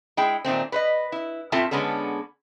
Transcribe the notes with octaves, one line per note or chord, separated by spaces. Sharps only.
G#3 E4 G5
A#2 D#3 A3 C4
B4 C5 D#5
E4
A2 C4 F4 A4 E5 A5
D3 G#3 B3 C#4 A4